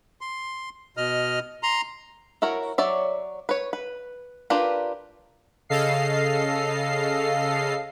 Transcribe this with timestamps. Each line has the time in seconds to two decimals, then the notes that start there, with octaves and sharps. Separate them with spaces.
0.21 C6
0.97 B2 D#5 F6
1.63 A#5 C6
2.42 E4 F#4 A#4 C#5
2.78 F#3 C#5 D5 E5
3.49 B4 C#5
3.73 B4
4.50 D4 F4 G4 A#4 B4
5.69 C#3 A4 D#5 F5 C7